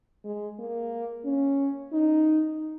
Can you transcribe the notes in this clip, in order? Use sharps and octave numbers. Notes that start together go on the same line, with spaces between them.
G#3
A#3
C#4
D#4